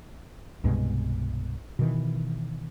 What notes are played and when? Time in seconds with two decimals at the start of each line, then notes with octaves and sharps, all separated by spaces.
0.64 C2 G2 B2 G#3
1.79 B2 D#3 E3